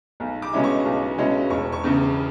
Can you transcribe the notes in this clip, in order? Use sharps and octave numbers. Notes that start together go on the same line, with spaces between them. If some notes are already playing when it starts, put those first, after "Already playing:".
B1
D6
B2 G#3 C#4 E4
C#6
B1
B2 G#3 C#4 E4
E1 C#6
C#6
E2 C#3